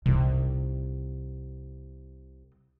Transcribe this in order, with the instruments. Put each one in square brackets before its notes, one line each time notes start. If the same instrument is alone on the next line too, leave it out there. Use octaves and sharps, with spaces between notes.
[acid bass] C2 [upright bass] C3 D#4